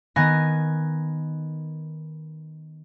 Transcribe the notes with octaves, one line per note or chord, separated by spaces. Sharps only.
D#3 B3 G#5 A#6